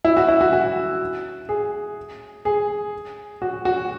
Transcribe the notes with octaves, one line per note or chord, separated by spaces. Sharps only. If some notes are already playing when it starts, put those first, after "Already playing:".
E4
F#4
E4
F#4
F#4
G#4
G#4
F#4
F#4